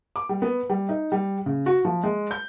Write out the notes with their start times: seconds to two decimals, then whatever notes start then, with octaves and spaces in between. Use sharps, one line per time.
0.16 D6
0.29 G3
0.42 B3
0.70 G3
0.89 D#4
1.12 G3
1.46 C#3
1.66 F#4
1.85 F3
2.04 G#3
2.31 G6